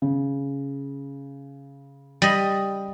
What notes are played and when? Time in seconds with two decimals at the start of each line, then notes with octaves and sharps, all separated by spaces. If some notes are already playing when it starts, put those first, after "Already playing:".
0.02 C#3
2.22 G3 D#5